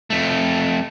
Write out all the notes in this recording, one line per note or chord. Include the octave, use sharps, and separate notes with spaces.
F2 A3